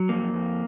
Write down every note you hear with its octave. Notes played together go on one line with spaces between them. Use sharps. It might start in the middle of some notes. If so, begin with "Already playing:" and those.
Already playing: F#3
F2 A#3
F2